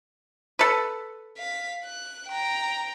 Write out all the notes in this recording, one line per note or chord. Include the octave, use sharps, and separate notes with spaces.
A4 B4
F5 B6
F#6
G5 A#5